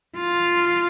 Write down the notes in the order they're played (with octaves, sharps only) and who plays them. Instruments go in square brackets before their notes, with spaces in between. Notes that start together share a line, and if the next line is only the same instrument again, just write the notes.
[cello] F4